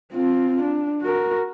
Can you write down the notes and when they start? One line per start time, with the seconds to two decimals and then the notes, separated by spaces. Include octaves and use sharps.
0.13 C4 F4
0.62 D4
1.02 F#4 A#4